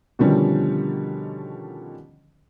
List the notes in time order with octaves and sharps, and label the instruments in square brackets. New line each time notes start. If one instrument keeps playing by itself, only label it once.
[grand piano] B2 D3 D#3 F3 G3 C#4